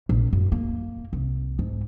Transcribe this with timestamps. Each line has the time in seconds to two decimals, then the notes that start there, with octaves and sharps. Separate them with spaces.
0.09 A#1
0.33 F#2
0.52 A#3
1.13 C2
1.59 G#2